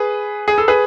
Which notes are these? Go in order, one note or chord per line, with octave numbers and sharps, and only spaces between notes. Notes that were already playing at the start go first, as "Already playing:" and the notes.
Already playing: G#4 B4
G#4
A4
G#4 B4